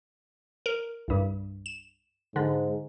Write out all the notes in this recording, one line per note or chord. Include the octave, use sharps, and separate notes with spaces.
A#4
C2 G2
E7
G#2 D3